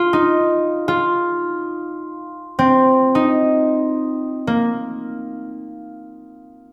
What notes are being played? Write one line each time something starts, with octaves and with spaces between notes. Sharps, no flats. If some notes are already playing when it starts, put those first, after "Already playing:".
Already playing: F4
D#4
F4
C4
D#4
A#3